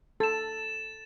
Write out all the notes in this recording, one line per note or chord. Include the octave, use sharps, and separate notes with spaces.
A4 A6 E7